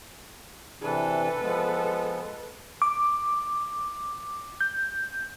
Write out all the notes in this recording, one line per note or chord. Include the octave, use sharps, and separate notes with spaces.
C3 E3 D4 A4 B4
F3 G#3 B3
D6
G6